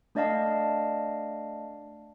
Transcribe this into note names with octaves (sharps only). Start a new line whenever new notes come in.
A3 D4 D5 D#5 F5 A5